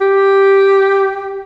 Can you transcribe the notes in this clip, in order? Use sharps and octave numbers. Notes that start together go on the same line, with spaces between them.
G4